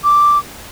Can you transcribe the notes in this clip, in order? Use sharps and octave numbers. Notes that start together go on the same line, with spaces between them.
D6